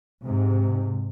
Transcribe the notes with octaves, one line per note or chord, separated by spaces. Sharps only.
G#2 C3